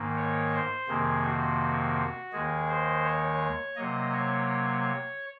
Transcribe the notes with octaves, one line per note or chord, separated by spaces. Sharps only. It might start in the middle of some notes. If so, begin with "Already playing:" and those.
Already playing: G#2 D#3 A#3
C#5
C5
F2 C3 D#3 A#3 G#4
F#4
D#2 D#3 G#3 G#4
C5
C#5
C3 F#3 A#3 D#5
C#5